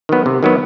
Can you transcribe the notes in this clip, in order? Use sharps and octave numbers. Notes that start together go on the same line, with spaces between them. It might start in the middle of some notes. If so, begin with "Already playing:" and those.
D#3 F#3 B3
C3
D#3 F#3 B3